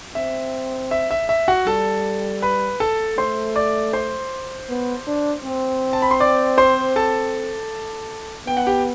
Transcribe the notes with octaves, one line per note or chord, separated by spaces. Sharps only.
C4 E5
E5
E5
E5
F#4 F#5
G3 A4 A5
B4 B5
A4 A5
A3 C5 C6
D5 D6
C5 C6
B3
D4
C4
A5
B5
C6
D5 D6
C5 C6
A4 A5
B3 G5
F#5
G4 G5